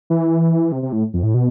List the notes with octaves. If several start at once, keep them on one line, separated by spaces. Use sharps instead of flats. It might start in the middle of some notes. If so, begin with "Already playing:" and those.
E3
C3
C3
A2
F2
A2
B2